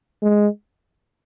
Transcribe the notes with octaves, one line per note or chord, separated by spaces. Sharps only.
G#3